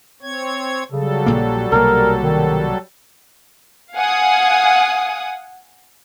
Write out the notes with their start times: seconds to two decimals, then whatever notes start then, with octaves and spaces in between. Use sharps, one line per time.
0.22 C4 C#5 G#6
0.92 C#3 F#3 G3 A4
1.26 A#1 A#2 A#3
1.72 C2 B2 A#3 A#4
2.20 D#3
3.96 F5 F#5 G#5 D#6